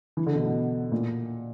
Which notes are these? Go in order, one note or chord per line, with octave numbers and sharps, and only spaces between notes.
E3
D3
B2
B2
A#2